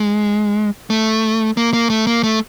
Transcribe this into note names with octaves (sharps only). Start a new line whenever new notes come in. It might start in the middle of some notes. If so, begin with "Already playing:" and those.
Already playing: G#3
A3
A#3
A#3
A3
A#3
A3